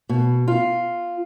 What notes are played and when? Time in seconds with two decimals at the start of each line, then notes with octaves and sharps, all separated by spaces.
0.09 B2
0.48 F4